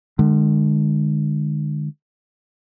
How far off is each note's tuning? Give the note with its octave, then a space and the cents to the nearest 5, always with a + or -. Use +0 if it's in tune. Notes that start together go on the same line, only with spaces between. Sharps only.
D3 +40 G#3 +0